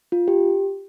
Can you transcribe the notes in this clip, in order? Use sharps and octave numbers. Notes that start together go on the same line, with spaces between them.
F4
G4